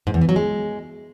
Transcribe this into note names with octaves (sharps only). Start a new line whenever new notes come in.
G#2
E2
E3
F#3
G#3